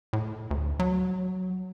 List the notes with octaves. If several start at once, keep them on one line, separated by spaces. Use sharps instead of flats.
A2
D2
F#3